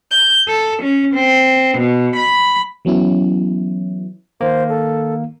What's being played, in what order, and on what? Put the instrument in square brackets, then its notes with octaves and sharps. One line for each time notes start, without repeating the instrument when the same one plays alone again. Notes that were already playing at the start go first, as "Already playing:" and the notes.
[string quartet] G6
A4
C#4
C4
B2
B5
[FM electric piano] E3 F#3 B3 C#4 E4
[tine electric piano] D#3 A#3 [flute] C5
[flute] A4